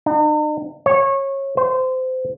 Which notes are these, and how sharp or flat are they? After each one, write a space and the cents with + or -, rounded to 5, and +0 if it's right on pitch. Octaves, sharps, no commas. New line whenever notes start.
D#4 -45
C#5 -20
C5 -25